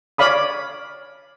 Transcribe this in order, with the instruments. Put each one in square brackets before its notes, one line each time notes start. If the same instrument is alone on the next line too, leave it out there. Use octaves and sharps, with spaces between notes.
[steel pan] C#5 D5 F5 B5 D#6